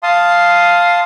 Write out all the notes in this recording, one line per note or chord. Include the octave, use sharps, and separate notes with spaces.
F5 A5 C6 D#6